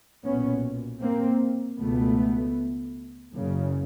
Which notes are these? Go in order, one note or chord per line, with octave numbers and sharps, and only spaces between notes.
B1 A#2 B3 C#4
A#3 C4
C#2 B2 A3 B3
F#1 F#2 C#3